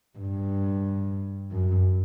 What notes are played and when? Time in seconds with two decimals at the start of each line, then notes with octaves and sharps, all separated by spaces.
0.18 G2
1.51 F#2